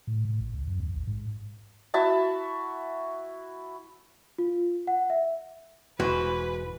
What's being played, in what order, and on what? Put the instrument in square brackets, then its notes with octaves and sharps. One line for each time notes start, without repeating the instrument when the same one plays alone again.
[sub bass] A2
A2
A1
C#2
F#2
D#2
A1
G#2
[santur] E4 F#4 E5 A5
[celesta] F4
F#5
E5
[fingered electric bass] E1 [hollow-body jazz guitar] G#2 E3 F#4 [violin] B4